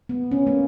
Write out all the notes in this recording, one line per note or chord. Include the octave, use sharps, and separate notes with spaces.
B3
C#4
A#3